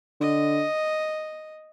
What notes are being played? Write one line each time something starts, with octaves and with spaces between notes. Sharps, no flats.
D3 D#5